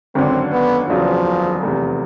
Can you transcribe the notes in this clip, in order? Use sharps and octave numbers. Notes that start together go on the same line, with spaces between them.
G#1 F#2 D3 C4
B3
F#1 E2 C#3 F3 F#3
F1 E2 C3